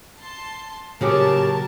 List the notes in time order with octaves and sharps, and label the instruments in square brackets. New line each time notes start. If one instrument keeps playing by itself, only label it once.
[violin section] A5 C6
[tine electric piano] A#2 G4 D6 [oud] C#3 F#3 C#4 [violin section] A#4 A5